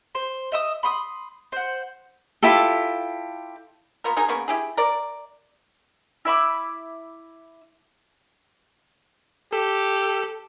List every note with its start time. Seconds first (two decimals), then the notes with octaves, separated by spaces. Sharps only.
0.15 C5
0.52 D#5 E5 D#6
0.83 B5 C6 D#6
1.52 C5 F#5
2.43 E4 F4 G4 A4
4.04 A#3 B3 F4 A#4
4.17 F#3 D#4 G#4 A#4
4.29 C#3 A#3 B3 C#6
4.48 E4 G4 G#4
4.77 A#4 D5
6.25 E4 E5 B5 D6
9.53 G4 A4